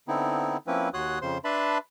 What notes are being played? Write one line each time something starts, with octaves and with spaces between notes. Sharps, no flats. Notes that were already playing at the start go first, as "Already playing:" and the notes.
D3 B3 C4 D#4 E4
F3 A#3 C4 C#4 E4 B4
D#2 F#4 C#5 C6 D#6 F#6
F2 C#3 C5 C6
D4 B4 E5 A5 B5 C6